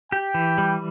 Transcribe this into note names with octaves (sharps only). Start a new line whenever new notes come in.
G4 G5
E3
G3